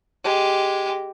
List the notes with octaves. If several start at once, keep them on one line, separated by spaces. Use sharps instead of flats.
G#3 G4